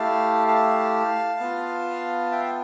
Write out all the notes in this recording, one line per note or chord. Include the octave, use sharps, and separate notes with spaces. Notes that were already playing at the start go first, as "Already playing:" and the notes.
Already playing: A3 E4 G4 F5 A5
F5 A5
B3 F4
E5 G5